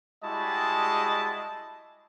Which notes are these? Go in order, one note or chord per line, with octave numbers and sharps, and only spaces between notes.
G3 G#3 E4 F#4 D#5 A5